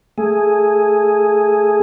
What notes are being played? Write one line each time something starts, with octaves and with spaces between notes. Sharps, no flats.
A3 G#4